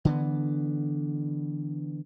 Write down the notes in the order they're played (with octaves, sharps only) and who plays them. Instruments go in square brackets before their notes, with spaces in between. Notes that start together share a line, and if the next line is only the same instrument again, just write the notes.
[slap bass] D3 E3 B3